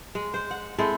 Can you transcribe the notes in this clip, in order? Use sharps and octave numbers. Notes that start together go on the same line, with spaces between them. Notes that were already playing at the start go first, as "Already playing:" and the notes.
G#3
C5
F#5
G#3 C4 E4 A4